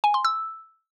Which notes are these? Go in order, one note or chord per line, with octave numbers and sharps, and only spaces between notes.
G#5
C6
E6